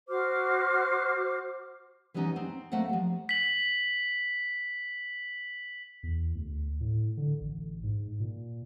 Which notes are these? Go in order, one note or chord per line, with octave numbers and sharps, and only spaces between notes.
F#4 C5 D6 F6
E3 G3 B3 C#4 D#4
C4
A3 A#3 C4 F#5
F3 G3
B6 F#7
E2
D2
A2
D3
A1
G#2
A#2